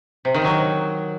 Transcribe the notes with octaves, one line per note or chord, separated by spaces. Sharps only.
C3
D#3
F#3